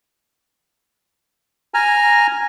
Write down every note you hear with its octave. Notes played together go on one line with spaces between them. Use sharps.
G#5 A#5 F6